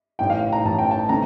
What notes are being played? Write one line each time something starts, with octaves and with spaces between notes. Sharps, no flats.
A1 A2 E3 G5
F5
A#5
A1 A2 E3 A5
G5
A5
D3 A3 C4 A#5